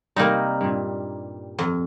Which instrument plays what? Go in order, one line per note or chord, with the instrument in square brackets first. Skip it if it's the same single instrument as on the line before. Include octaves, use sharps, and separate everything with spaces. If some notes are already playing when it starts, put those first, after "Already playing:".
[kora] C3 G3 [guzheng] A#3 D#4
[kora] G2 A#2
[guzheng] F2